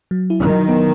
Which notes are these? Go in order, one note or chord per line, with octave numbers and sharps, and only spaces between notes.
F#3
E4
D#3
F#3
B3